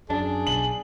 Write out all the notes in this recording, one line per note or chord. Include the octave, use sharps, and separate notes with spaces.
F#2 D4 G#4
B1 F#7